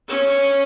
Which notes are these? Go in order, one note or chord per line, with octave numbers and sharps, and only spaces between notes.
C#4